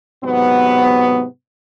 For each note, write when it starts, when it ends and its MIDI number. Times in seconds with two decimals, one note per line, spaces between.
0.24 1.24 44
0.24 1.24 48
0.24 1.24 54
0.24 1.24 59